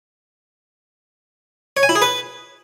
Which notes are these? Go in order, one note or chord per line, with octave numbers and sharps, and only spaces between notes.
C#5
G#5
E4
G#4
B4